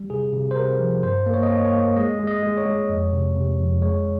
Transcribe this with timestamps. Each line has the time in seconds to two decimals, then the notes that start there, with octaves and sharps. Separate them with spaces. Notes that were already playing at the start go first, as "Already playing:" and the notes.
Already playing: G3
0.10 C3 G#4
0.33 C3
0.51 C5
0.56 C3 A#4
0.79 F3
1.03 G2 C5
1.26 A#3
1.34 C#5
1.43 D#5
1.50 A#3 C#5
1.65 C#5
1.72 A#3
1.96 G#3 D#5
2.20 G#3
2.27 D#5
2.43 G#3
2.57 C#5
2.66 G#3
2.89 F2
3.13 C3
3.36 C3
3.59 F2
3.82 G#3 C#5